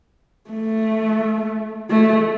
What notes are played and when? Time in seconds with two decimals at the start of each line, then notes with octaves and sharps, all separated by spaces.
0.50 A3
1.90 A3